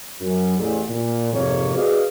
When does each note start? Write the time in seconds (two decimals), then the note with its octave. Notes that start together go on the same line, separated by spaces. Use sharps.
0.21 F#2
0.57 A1 E2
0.90 A#2
1.33 F2 G#2 C3 A#3 C#5
1.76 F#4 G#4 B4 D5 D#5 F5